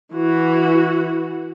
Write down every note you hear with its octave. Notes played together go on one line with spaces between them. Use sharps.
E3 F#4